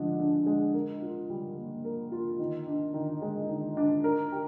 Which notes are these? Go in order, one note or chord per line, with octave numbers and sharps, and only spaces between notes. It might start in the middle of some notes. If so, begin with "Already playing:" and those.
Already playing: D3 F3 G#3 D4
D4
G#3
A#4
F4
G3
A#3
A#4
F4
D#3
D4
D#3
G#3
D#3
D4
A#4
G4